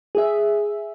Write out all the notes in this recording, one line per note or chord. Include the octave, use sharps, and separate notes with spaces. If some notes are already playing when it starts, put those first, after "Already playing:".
G#4 E5